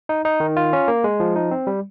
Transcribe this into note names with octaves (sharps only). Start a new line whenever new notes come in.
D#4
D#4
D#3
F4
C#4
A#3
G#3
F3
D#4
C4
G3